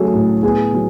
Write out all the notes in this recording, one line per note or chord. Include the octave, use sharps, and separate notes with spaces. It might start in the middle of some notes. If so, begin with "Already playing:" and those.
Already playing: F#3 A3 C#4 F#4 G#4 A4
A2
B3 G#4
F#3